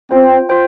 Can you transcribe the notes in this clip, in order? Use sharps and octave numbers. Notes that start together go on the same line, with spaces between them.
C4 F4 C5 G5
F4 C5 G5